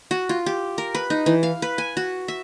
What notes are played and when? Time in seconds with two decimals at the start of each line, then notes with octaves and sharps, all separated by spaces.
0.11 F#4
0.29 F4
0.46 G4
0.78 A#4
0.95 B4
1.10 D#4
1.26 E3
1.43 F5
1.62 B4
1.78 G#5
1.97 F#4
2.28 E5